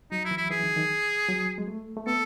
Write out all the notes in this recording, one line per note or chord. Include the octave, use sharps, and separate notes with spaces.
F#3 D#4
E4
E3
E4
E3 G#4
D#3
D#3
F#3
G#3
A3
A3
B3 A4